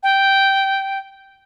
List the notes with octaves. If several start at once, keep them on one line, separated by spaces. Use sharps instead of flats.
G5